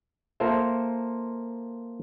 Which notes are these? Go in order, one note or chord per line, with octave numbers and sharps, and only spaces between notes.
A#3 F4 A4 A#4 C5 E5